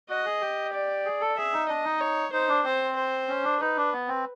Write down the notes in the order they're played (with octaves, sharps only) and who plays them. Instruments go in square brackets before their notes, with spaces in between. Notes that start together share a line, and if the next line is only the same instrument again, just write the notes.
[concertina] F#4 [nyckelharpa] D#5
[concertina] G#4
G4
[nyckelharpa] D5
[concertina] G#4
A4
[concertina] G#4 [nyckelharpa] E5
[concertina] D#4
[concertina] D4 [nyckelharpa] D#5
[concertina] D#4
[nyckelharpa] C#5
[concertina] D#4 [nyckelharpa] C5
[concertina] D4
[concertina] C4 [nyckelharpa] C5
[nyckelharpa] C5
[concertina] C#4
D4
[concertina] D#4 [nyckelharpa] B4
[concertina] D4
B3
C4